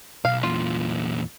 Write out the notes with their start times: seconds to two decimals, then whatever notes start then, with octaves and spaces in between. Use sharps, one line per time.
0.25 B1 F5
0.43 E2 A#2 F4